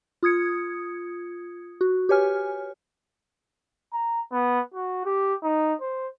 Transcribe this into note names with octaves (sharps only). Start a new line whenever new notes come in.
F4 D#6 G#6 C#7
F#4
G4 B4 C#5 G#5 F6
A#5
B3
F#4
G4
D#4
C5